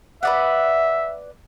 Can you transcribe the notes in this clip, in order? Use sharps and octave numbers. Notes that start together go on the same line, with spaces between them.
B4 D5 E5 F#5